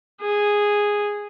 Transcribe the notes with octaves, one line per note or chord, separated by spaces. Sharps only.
G#4